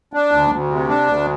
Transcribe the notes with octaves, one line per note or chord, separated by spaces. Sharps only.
D4
D2
D2
C3
D4
D2